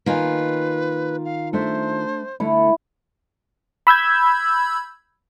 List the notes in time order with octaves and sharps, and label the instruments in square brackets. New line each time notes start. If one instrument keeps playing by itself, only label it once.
[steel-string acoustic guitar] D#3 F4 [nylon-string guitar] A#3 D#5 G#5 [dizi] B4
[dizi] F5
[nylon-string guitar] A3 D4 E5 [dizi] C5
[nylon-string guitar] D3 A3 [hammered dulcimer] E4
[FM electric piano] B5 E6 G6 G#6